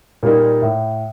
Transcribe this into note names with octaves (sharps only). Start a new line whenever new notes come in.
A#2 G3 A#3 D#4
A2